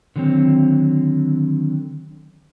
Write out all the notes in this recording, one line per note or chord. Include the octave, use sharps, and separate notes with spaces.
D3 D#3 F#3 B3 C4